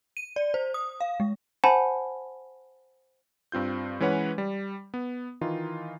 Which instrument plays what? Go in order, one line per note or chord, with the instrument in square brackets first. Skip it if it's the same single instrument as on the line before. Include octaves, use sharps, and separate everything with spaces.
[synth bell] D#7
D5
C5
D#6
F5
G#3
[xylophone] C5 F#5 G#5 A5 B5
[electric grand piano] G2 C4 F4 G6
E3 G#3 C#4 B4 C#5 F#5
G3
B3
D#3 E3 D#4 F4